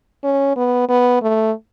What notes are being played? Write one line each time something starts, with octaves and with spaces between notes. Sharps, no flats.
C#4
B3
B3
A3